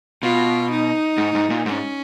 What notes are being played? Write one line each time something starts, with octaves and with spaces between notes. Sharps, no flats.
B2 F4
D#4
G#2
G#2
A#2
G#2 C#4